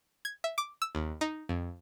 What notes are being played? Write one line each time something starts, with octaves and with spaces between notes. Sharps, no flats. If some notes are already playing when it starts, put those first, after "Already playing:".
G#6
E5
D6
E6
D#2
D#4
F2